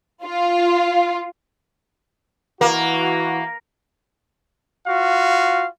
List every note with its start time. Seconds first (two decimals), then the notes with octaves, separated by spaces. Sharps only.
0.24 F4
2.61 E3 A#3 F#4
4.86 F4 F#4 F5